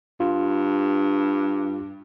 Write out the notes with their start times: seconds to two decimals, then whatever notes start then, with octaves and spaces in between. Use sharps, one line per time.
0.20 G2 F4